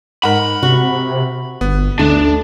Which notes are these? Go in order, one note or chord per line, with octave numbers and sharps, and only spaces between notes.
G#2 A#4 F#5 B5
C3 F#4
G1 B3
D2 A3 D4